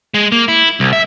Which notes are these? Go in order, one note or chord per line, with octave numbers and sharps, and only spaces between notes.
G#3
A#3
E4
C2
E5